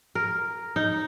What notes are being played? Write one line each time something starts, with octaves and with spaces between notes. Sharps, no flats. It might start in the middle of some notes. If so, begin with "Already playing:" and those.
A#4
D#4